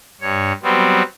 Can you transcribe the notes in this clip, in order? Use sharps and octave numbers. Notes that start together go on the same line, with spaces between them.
G2 C#5
F#3 G3 B3 C4